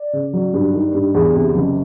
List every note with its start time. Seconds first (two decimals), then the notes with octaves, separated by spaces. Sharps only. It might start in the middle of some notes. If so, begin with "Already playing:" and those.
Already playing: D5
0.13 C#3
0.33 F#3
0.54 G2
0.74 D#3
0.95 G2
1.14 E2
1.36 C3
1.56 F#1